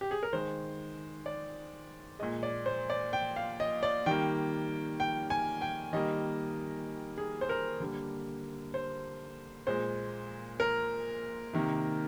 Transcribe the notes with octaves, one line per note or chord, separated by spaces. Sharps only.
G4
G#4
A#4
D#3 G#3 C5
D5
A#2 G#3 D#5
D5
C5
D5
G5
F5
D#5
D5
D#3 G3 A#3 G5
G5
G#5
G5
D#3 G3 A#3 D#5
G#4
C5
A#4
D3 G3 A#3
C5
A#2 G#3 C5
A#4
C3 D#3 A#3